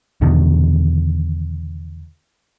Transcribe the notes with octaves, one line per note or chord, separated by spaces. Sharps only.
E2 B2 D3 D#3